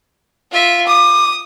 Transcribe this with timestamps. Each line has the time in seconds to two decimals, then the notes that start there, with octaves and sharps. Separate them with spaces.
0.52 F4 E5
0.87 D6 D#6